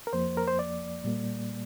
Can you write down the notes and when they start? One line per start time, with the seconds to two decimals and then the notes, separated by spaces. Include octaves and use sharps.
0.07 A#4
0.13 F2 F3 A#3 C5
0.37 A#4
0.48 C5
0.59 D5
1.04 A#2 G3 A#3